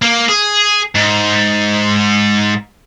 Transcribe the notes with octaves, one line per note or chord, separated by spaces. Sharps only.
A#3
G#4
G#2